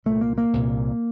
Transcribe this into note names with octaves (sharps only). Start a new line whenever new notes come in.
C2 A#2 A3
A#3
A#3
C2 A#2